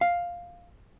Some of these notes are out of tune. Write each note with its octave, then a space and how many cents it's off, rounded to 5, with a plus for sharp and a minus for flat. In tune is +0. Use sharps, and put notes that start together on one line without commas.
F5 +5